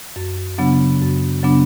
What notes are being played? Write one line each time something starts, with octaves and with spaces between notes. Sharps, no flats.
F#2
C#3 F#3 B3 D4
F#2
C#3 F#3 B3 D4